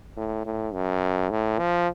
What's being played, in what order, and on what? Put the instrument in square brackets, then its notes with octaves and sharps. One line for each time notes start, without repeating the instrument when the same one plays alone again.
[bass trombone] A2
A2
F#2
A2
F3